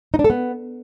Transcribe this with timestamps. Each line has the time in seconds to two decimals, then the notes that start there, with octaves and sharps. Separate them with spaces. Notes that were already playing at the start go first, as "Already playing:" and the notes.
0.14 D#4
0.19 D4
0.24 A4
0.30 B3